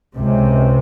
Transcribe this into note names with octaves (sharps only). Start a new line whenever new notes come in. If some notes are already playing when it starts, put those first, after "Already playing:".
C#2 C3